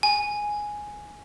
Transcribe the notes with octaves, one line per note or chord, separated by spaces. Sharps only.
G#5